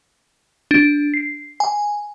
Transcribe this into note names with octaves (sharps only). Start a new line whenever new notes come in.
D4
C7
G#5